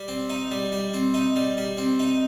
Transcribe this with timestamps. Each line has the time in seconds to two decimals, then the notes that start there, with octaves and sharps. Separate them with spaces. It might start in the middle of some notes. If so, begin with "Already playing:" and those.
Already playing: G3
0.08 C4
0.30 D#4
0.51 G3
0.72 G3
0.94 C4
1.14 D#4
1.36 G3
1.57 G3
1.77 C4
1.99 D#4